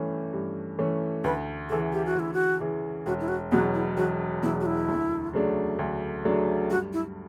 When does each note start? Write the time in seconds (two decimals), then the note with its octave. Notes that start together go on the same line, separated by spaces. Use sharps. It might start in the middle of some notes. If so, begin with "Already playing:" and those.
Already playing: G2 E3 A3 C#4
0.33 G2
0.79 E3 A3 C#4
1.24 D2 B4
1.69 C#3 E3 A4
1.93 G4
2.06 F#4
2.15 D2 E4
2.33 F#4
2.60 C#3 E3
3.06 E1 F#4
3.20 E4
3.28 F#4
3.52 E2 B2 F#3 F#4
3.74 E4
3.97 E1 F#4
4.43 E2 B2 F#3 E4
4.60 F#4
4.66 E4
4.88 D2
5.33 C#3 F#3 A3 D4
5.79 D2
6.24 C#3 F#3 A3 D4
6.69 G2 F#4
6.93 E4